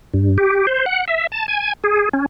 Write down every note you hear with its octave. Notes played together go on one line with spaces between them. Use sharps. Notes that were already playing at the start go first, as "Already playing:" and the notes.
G2
G4
C5
F#5
E5
A5
G#5
G#4
C#4